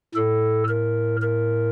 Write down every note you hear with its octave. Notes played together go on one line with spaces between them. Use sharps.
A2 A4
A#4
A#4